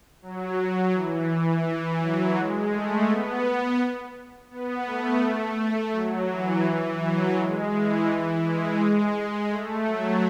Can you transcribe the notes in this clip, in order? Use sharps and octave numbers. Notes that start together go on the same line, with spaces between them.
F#3
F#3
E3
E3
F#3
G#3
A3
B3
B3
A3
F#3
E3
F#3
G#3
E3
G#3
A3
F#3